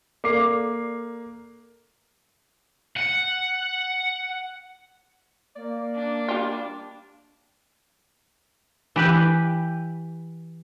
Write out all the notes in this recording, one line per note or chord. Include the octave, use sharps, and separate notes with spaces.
A#3 A4 D5 D6 C7
F#5
A#3 D5
D4
G3 F4
E3 G4 B4